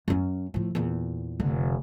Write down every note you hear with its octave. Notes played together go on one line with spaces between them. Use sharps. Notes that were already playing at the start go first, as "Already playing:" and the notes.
F#2 C#4
A2 F3
E2 A#2
F1 D3